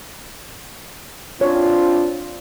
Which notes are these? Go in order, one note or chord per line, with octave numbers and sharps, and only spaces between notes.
C4 D4 F4 C#5